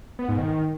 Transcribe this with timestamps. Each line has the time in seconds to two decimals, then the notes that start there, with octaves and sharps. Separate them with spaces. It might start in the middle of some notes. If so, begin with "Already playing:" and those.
0.19 B3
0.29 G#2
0.38 D#3